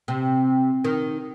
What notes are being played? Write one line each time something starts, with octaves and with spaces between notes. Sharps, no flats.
C3
D#3